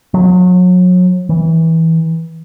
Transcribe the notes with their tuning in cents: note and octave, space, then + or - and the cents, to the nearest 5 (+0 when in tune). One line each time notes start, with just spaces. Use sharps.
F#3 -35
E3 -20